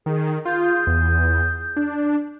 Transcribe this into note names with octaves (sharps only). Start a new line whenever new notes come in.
D#3 G#4
F4 G#4 G6
E2
D4